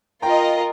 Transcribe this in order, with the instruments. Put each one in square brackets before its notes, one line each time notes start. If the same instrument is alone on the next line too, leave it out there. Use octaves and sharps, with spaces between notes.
[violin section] F4 A#4 D#5 [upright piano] G5 A#5